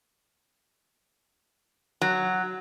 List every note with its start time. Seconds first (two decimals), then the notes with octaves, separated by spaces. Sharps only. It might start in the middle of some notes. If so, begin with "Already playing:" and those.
2.01 F#3